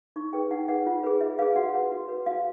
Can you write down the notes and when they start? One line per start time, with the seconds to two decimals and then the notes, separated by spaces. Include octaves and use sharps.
0.16 D#4 C#6
0.33 G#4 B4 G5
0.51 D#4 F#5
0.68 G#4 B4 F#5
0.86 F4
1.03 G#4 B4
1.21 F4 E5
1.39 G#4 B4 F5
1.56 F#4 F#5
1.74 B4
1.92 F#4
2.08 B4
2.26 F#4 F5